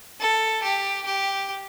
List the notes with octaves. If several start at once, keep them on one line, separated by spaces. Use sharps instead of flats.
A4
G4
G4